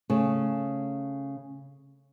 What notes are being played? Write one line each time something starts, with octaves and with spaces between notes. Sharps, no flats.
C#3 A3